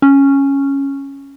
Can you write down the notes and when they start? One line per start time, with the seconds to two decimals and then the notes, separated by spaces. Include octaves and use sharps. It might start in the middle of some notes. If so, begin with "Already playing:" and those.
0.02 C#4